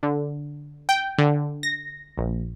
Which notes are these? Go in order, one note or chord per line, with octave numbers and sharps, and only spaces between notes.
D3
G5
D3
A#6
A#1